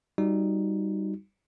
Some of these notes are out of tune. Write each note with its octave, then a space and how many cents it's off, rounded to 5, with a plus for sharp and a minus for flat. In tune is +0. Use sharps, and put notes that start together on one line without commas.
G3 +0 D#4 +0 F#4 -20